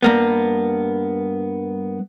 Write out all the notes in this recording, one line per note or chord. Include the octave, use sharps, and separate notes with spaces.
G2 A#3 B3